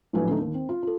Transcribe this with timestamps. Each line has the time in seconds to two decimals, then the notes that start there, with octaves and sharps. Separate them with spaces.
0.13 A#1 A2 F#3 E4 B4 G#5
0.29 D3 A3 D#4
0.41 D#2
0.54 C4
0.69 F4
0.83 F4 A4